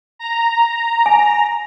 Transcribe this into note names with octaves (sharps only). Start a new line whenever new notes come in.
A#5
G#5